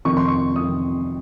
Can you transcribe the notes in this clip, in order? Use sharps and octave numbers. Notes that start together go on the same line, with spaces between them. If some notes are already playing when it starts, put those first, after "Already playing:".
F2 C3 D#3 C#6
C6
C#6
F2 C3 D#3 D#6